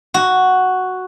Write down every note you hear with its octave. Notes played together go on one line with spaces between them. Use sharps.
F#4